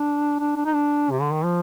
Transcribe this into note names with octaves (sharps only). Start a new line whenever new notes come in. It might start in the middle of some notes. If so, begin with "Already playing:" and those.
Already playing: D4
D4
D4
D#4
D4
C3
D3
D#3
F3